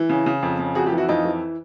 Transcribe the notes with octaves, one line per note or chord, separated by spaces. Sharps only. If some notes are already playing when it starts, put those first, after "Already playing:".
Already playing: E3
C#3
C#3
F2
C#3
F2 F#4 G#4
F4 G4
E3
E4 F#4
F2 D#4 F4
E3